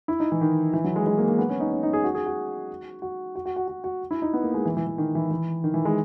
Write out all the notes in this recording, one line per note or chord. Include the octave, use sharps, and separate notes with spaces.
E4
D#4
E3
D#3
E3
F#3
G#3
G#3
A#3
A#3
B3
C#4
D#4
C#4
D#4
G#4
F#4
G#4
F#4
F#4
F#4
F#4
F#4
F#4
F#4
E4
D#4
B3
A#3
G#3
E3
E3
E3
D#3
E3
E3
D#3
E3
G#3